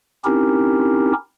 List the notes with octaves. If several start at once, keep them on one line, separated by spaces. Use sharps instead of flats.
C4 C#4 D#4 E4 G4 A#4